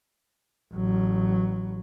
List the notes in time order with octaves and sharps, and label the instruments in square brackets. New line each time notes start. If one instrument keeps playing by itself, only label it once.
[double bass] A1 F#3